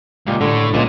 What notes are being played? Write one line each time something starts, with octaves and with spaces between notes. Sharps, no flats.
C#2 A#2 G4 D#5
A2 D3
C#2 A#2 G#3